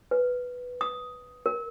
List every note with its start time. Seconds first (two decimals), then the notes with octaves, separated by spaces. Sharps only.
0.11 B4
0.81 D#6
1.46 A#4